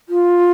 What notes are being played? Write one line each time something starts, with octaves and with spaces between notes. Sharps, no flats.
F4